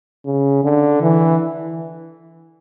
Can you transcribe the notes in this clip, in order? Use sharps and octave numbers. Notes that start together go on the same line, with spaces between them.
C#3
D3
E3